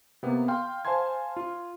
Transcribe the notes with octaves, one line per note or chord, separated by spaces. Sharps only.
C3 A#3 B3
F5 G5 C6 F6
C5 F5 G#5 A5 C6 G#6
F4